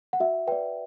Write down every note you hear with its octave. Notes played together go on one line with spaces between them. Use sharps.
F#5
F#4 E5
B4 D5 G5